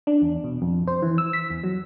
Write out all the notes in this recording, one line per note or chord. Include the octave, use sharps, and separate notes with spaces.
D4
E2
B2
F2
C5
E3
E6
B6
E2
F#3